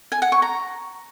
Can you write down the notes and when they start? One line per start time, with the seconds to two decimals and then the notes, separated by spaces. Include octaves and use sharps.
0.12 G#5
0.22 F#5
0.32 C#6
0.42 A#5